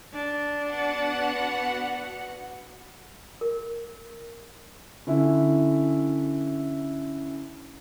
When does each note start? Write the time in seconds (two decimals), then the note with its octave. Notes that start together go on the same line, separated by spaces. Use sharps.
0.14 D4
0.69 B3 F#4 F#5
3.41 A#4
5.07 D3 C#4 E4